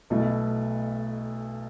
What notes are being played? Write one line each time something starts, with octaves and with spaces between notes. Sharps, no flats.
B1 B2 A3 E4 A4